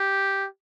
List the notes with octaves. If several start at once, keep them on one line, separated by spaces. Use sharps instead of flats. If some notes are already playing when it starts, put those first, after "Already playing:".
Already playing: G4